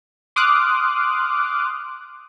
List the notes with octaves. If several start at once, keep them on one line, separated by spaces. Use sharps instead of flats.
C6 D6 D#6 F6 F#6